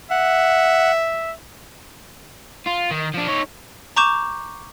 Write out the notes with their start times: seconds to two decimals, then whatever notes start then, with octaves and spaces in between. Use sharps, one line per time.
0.11 E5 F#5
2.67 F4
2.91 D#3
3.15 F3 D4
3.28 D#4 C#5
3.96 A#5 C#6 D6 G6 E7